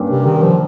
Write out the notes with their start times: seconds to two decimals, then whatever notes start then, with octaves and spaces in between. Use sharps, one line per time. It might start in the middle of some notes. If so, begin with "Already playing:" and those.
Already playing: G2 G3 A#3 C#4 G4
0.10 C3
0.26 D#3
0.43 F3